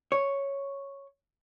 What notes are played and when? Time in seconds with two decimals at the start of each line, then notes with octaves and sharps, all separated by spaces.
0.12 C#5